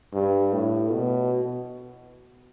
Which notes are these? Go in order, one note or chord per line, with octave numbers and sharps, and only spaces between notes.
G2
A2
B2